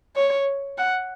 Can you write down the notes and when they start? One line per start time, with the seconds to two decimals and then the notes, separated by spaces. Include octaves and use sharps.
0.16 C#5
0.78 F#5